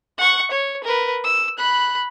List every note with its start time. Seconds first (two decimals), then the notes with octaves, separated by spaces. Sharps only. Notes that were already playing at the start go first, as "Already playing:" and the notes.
0.18 F#5 C#6
0.51 C#5
0.84 A#4 B4
1.24 E6
1.58 B5 F#6